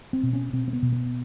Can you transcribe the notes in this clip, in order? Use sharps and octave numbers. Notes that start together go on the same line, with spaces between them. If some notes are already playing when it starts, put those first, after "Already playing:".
C4
B2
C#4
B2 C4
C4
B3
B2
B3